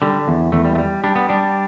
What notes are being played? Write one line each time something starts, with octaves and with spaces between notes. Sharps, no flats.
D3 G3
E2
E2 A3
G3
A3
G3
G3 D4
B3
G3 D4